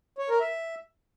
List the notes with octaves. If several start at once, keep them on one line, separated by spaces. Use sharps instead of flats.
C#5
A#4
E5